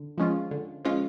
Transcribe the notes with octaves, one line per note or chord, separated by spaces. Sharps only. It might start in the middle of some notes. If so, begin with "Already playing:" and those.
Already playing: D3
F3 G#3 C#4 F4
D3
F3 G#3 C#4 F4